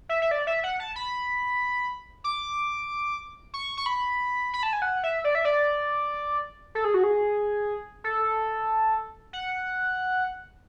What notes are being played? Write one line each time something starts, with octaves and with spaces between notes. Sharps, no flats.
E5
E5
D5
E5
F#5
A5
B5
D6
C#6
C#6
B5
B5
A5
G#5
F#5
E5
D5
E5
D5
A4
G#4
F#4
G#4
A4
F#5